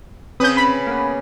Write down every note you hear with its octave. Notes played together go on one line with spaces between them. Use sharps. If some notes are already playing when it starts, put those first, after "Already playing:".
C#3 C4 C#4 B4 D#6 G6
B5
A#3 B3